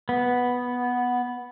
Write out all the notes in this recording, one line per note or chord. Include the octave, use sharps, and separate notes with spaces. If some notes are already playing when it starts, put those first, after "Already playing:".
B3